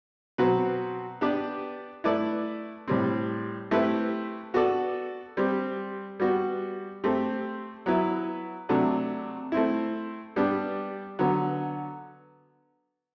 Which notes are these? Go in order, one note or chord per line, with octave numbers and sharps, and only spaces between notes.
B2 F#3 C4 F#4 B4
B3 D4 G4 B4 D5
A3 E4 B4 D5
A2 G3 C4
A3 C4 E4 G4 B4
B3 F#4 A4 D5
G3 C4 G4
G3 B3 F#4
A3 C4 G4
F#3 B3 E4 B4
C3 F#3 A3 D4
A3 C4 E4
G3 B3 D4 G4
D3 F#3 B3